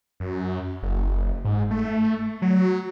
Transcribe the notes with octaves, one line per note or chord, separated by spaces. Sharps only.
F#2
F#1
G#2
A3
F#3